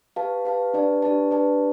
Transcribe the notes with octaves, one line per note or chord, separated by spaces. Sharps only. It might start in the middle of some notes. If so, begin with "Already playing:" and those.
G4 B4 F5 A5
G4 B4 F5 A5
D4 G4 B4 D5 A5
D4 G4 B4 D5 A5
D4 G4 B4 D5 A5